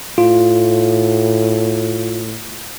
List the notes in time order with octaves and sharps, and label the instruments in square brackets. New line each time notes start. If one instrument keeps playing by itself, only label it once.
[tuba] A2 [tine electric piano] F4